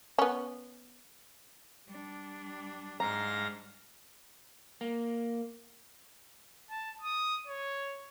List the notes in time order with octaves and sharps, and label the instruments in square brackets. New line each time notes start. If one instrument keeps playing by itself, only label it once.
[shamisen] B3 C#4
[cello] G3 D4
[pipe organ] G#2 F5 A#6 [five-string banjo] A#5
[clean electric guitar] A#3
[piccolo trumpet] A5
D#6
C#5